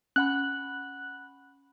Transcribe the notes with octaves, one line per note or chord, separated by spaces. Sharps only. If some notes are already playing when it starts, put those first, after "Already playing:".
C#4 F#5 B5 F#6